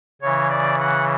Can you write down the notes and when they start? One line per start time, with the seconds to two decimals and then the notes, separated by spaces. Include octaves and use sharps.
0.22 C#3 E3 C#5
0.50 D5
0.79 F#5